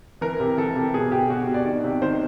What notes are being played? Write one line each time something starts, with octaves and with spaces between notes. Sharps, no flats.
E3 A#4
C3
E3 A4
C3
B2 G#4
B2 G4
B2 F#4
B2
D5
D#3 D5
C3
D#3 C5